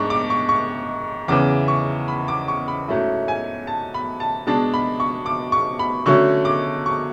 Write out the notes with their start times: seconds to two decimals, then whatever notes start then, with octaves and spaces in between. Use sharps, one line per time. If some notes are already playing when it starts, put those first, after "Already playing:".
Already playing: G#2 G#3 D4 C#6
0.10 D6
0.30 C#6
0.49 C#6
1.28 E2 C#3 E3 D6
1.68 C#6
2.08 B5
2.28 D6
2.48 C#6
2.68 B5
2.88 G#2 F#3 A3 C#4 E4
3.28 G#5
3.67 A5
3.94 B5
4.20 A5
4.47 B2 G#3 D4 A5
4.74 B5
5.00 C#6
5.26 D6
5.52 C#6
5.79 B5
6.06 D3 F#3 A3 C#4 C#6
6.45 D6
6.86 C#6